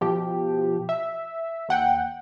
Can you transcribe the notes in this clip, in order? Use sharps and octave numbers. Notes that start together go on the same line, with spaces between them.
B2 F3 G4
E5
D#2 F#5 G5